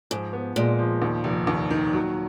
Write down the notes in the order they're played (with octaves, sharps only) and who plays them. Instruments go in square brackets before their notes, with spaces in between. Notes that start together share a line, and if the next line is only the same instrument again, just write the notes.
[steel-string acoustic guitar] G#2 [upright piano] F3
[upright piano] B3
[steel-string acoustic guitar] A#2 [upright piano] G#3
[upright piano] F3
D#2
F1
D#2
D#3
F#3